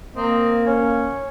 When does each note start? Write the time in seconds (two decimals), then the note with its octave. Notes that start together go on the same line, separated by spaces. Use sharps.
0.16 A#3 C4 D#5
0.66 C#4 C#5